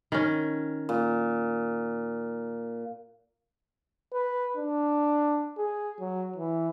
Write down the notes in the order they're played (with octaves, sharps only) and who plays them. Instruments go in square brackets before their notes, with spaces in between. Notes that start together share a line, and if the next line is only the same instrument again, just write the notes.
[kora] D#3 C#4
[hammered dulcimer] A#2
[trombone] B4
D4
G#4
F#3
E3